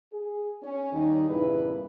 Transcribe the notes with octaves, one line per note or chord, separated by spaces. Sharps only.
G#4
C#4
D#2 D#3 G3 D#4
E2 G2 A#2 C#3 E4 B4